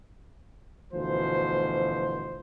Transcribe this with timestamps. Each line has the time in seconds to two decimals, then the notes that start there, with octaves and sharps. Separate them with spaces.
0.93 D2 B2 E3 F3 C5